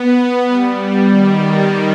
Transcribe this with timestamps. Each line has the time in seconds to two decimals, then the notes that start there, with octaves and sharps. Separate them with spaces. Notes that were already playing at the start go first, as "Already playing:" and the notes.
Already playing: B3
0.46 G3
1.09 D#3